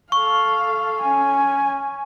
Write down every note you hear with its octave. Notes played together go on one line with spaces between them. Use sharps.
A4 F5 C#6
C#4 G#5